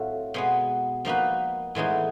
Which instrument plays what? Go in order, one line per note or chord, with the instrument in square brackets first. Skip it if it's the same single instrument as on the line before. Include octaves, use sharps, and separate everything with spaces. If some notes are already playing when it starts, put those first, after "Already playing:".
Already playing: [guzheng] A2 F#3 A3 C4 F4
B2 G#3 B3
F3 A#3 D#4 F#4 B4
A2 E3 G#3 B3 D#4